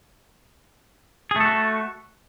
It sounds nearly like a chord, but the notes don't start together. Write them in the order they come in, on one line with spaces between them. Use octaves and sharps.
G#4 A3 A4 F#4